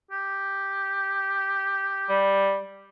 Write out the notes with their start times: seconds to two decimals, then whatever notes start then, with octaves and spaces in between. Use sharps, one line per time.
0.11 G4
2.09 G3